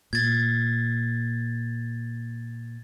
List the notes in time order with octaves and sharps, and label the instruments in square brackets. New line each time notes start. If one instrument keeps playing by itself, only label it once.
[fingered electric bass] A#2 [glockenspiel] G#6 A6